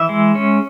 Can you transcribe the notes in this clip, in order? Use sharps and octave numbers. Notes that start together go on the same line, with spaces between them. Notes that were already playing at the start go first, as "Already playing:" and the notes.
Already playing: E3 E5
G#3
C#4